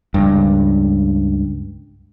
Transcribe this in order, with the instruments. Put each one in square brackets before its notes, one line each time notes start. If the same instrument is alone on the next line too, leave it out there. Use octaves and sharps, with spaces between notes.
[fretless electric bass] C#2 G2